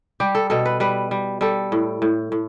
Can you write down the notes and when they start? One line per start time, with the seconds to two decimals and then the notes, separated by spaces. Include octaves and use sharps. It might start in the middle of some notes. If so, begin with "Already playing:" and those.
0.20 G3 G4
0.35 A4
0.50 B2 A4
0.66 B4
0.80 G3 B4
1.11 G3
1.41 G3 A4
1.72 A2
2.02 A2
2.32 A2